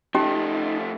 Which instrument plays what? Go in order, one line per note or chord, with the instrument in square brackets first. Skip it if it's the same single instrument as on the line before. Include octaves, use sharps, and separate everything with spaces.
[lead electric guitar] F3 A3 [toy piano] C#4 G4 A5 [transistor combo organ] D#4